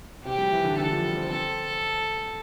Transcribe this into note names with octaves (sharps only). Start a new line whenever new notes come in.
C3 G4
G3
E3
D3
D3 A4
F3
G3
C4
C4 A4